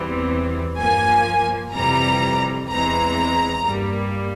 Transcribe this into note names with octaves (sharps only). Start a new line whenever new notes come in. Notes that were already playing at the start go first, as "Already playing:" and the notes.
Already playing: E2 E3 G3 C4
G2 F3 A#3 G#5
F2 C3 E3 G3 A#5
E2 E3 G#3 C4 A#5
G2 G3 A#3